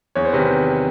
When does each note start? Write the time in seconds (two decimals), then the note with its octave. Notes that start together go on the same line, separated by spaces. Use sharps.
0.15 E2 C#5
0.25 C5
0.33 C3 D#3 B4